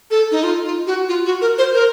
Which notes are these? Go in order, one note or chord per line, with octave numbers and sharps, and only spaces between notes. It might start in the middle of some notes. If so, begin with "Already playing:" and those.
A4
D#4
F4
F4
F#4
F4
F#4
A#4
C5
A#4